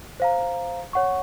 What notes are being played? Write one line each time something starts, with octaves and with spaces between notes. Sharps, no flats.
C5 F5 A#5
C#5 F#5 C#6